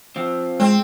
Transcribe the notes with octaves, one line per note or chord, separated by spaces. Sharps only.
F3 C4 F5
G#3 C4